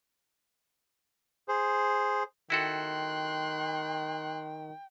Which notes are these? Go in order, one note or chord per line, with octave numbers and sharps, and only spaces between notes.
G#4 C5
D#3 E4 F#4 A4 G5 C6 F#6